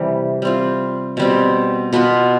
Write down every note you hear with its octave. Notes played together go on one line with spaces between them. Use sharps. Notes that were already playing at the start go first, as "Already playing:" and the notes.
Already playing: C3 E3 G3
G3 C4 F4
B2 G3 C4
B2 B3 F4 B4